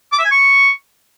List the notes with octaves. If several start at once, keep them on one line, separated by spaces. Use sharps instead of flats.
D6
E5
G#5
C#6